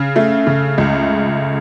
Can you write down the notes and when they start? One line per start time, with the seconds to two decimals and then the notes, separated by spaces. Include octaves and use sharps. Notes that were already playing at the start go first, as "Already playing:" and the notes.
Already playing: C#3
0.16 A3
0.47 C#3
0.78 C#2